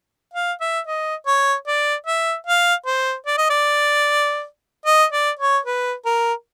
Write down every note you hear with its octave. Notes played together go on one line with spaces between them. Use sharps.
F5
E5
D#5
C#5
D5
E5
F5
C5
D5
D#5
D5
D#5
D5
C#5
B4
A#4